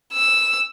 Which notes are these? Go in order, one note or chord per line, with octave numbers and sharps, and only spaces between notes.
E6